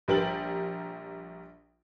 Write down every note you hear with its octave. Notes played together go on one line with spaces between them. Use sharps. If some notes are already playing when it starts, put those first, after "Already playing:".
A#1 G3 A#4 G5 A6 F#7